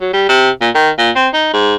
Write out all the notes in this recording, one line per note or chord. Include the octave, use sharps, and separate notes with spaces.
F#3
G3
C3
A#2
D#3
A#2
C4
D#4
G#2